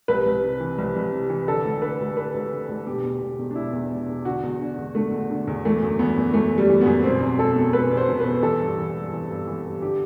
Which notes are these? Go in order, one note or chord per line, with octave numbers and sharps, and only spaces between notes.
C2 B4
C2
C3
E3
C2
C2
C3
E3
D3 A4
D2
D3 B4
D2
D3 B4
D2
D3
D2
B2 G4
E2
B2
E2
D4
B2 E4
E2
B2
E2
D3 F#4
E2
D3
E2
D3 A3
E2
D3
E2
E3 A3
F#2
E3 B3
F#2
E3 A3
F#2
G3
E3
F#2 B3
B2 C4
E2
B2 A4
E2
B2 B4
E2
C5
B2
B4
E2
E3 A4
G2
E3
G2
E3
G2
E3
G2
D3 G4